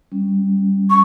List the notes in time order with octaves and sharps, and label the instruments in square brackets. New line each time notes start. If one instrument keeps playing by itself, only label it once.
[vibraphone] G3 C#4
[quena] C#6